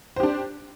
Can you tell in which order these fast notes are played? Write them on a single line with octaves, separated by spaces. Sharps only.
C5 G4 D4